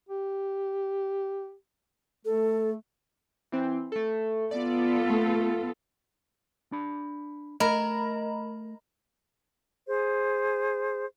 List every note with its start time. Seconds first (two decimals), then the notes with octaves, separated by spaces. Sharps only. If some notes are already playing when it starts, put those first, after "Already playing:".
0.09 G4
2.25 A3 A4
3.52 E3 C4
3.92 A3 A4
4.51 B3 F4 A4 D5
5.10 A3
6.72 D4 B5
7.60 A3 A#4 D#5 B5
9.87 G#4 C5